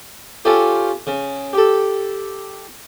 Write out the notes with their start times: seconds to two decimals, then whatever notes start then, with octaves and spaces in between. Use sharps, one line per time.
0.45 C#4 F4 G4 A4
1.07 C#3
1.53 G4 A4